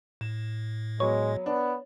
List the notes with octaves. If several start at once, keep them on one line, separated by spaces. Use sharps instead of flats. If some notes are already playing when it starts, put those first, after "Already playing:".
A2 E7
F#3 G#3 B3 C#5
B3 D4